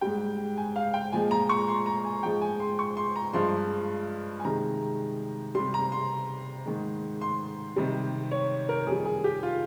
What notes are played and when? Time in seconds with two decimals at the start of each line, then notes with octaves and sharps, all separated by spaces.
0.01 G#2 G3 G5
0.57 G#5
0.76 F5
0.94 G5
1.12 A#2 F3 G#3 G#5
1.31 A#5
1.49 C#6
1.68 C6
1.86 A#5
2.05 G#5
2.23 G#2 F3 G#3 G5
2.41 G#5
2.60 C6
2.79 C#6
2.97 C6
3.16 A#5
3.33 G2 F3 G#3 C6
4.40 G#5
4.44 C3 D#3 G#3 A#5
5.55 C3 G3 C6
5.74 A#5
5.92 C6
6.66 G#2 D#3 G#3
7.21 C6
7.76 C3 D#3 G3
8.31 C#5
8.69 A#4
8.87 F2 D#3 G3 G#4
9.05 G#4
9.24 G4
9.43 F4